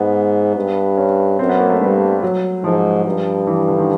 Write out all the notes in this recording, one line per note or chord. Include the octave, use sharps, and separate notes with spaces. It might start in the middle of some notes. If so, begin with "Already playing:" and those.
Already playing: G#2 B3
G2
C#4
F#2 C4
B3
A#3
A3
G2 G3
F#3
G#2 F3
G2
E3
D3
D#3